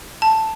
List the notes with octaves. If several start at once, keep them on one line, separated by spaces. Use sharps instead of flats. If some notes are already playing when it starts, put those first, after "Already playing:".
A5